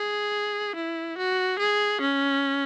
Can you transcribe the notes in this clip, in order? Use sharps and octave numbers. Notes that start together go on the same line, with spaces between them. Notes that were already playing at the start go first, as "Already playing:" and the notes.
Already playing: G#4
E4
F#4
G#4
C#4